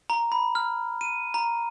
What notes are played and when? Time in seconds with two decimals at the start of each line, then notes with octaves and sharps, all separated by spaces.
0.10 A#5
0.32 B5
0.55 F6
1.01 D#7
1.34 A#5